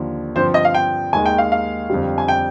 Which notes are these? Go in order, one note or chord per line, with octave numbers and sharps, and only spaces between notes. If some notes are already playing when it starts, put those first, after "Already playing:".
Already playing: D#2 D3 F3
G2 D3 F3 C4 C5
D#5
F5
G5
D#2 D#3 G#3 G#5
G5
F5
F5
F2 D3 G3
G#5
G5